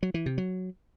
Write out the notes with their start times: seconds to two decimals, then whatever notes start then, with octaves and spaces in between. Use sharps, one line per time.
0.03 F#3
0.14 E3
0.26 C3
0.38 F#3